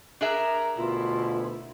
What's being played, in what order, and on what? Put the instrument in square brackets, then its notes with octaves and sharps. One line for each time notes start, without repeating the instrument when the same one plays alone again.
[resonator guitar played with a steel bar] D4 G#4 E5 [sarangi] A#4
[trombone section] D2 B2 [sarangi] E4 [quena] F4